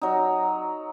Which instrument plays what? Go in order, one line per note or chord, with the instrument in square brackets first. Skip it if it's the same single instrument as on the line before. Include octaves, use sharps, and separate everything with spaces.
[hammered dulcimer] F#3 D#4